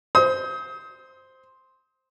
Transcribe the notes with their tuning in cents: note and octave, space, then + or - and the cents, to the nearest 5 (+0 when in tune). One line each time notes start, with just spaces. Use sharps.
C5 +0 D#6 +40